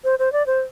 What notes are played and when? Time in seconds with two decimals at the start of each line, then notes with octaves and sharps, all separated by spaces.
0.04 C5
0.19 C5
0.33 D5
0.47 C5